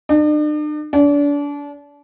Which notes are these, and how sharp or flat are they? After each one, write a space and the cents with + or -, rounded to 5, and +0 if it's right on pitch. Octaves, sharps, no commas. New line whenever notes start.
D4 +45
D4 -30